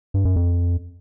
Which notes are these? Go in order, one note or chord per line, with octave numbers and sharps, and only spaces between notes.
G2
F#2
F2